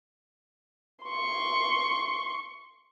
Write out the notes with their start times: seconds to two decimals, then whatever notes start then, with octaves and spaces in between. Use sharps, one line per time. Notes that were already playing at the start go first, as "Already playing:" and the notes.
1.05 C6 C#6